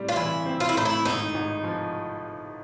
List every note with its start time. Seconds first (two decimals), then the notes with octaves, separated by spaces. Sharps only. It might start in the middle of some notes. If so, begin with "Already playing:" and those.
Already playing: A2 G3 C4
0.09 F4
0.16 E3 E4
0.46 C4
0.60 F4
0.69 E4
0.75 A2 D#4
0.85 E4
1.05 G#1 D#4
1.34 G#1
1.64 F3